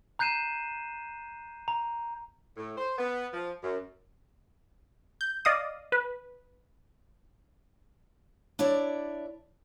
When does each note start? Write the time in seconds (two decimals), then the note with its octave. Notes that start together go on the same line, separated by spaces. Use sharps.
0.19 A#5 F#6 G6 C7 D#7 E7
1.68 A#5
2.57 A2
2.77 C5
2.98 B3
3.33 F3
3.63 F#2
5.21 G6
5.45 D5 D#5 F5 D#6
5.92 B4
8.59 D4 E4 C#5 D5 E5